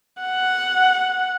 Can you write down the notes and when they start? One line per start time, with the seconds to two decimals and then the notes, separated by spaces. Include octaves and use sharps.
0.22 F#5